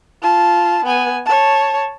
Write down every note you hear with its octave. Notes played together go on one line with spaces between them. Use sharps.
F4 A5
B3 G#5
C#5 A5